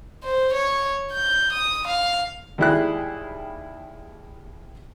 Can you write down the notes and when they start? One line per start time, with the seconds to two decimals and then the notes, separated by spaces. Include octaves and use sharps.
0.23 C5
0.53 C#5
1.12 G6
1.52 D#6
1.87 F5
2.58 D#2 G3 G#3 E4 G#4 F#6